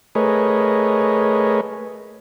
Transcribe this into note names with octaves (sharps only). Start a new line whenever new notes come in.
A3 G#4 A#4 B4 C#5 D#5